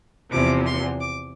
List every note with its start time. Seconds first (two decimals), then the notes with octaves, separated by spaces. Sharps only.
0.31 E2 C3 F3 D6
0.66 C6
1.00 D6